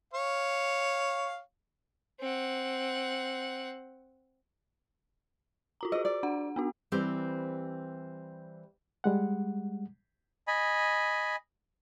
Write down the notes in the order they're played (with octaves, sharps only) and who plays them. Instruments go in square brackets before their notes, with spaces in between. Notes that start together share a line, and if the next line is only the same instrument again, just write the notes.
[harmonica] C#5 F5
[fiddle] C4 F#5
[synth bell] F4 F#4 A#5
[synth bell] F#4 G#4 [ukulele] D#5
[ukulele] D5
[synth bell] D4 F#5
B3 D4 F#4
[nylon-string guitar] E3 G3 C4 G4 B4 C5
[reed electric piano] G3 G#3 F#5
[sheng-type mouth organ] D#5 G#5 B5